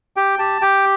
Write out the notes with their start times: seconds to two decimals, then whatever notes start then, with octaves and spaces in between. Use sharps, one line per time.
0.16 G4 G5
0.39 G4 A5
0.62 G4 G5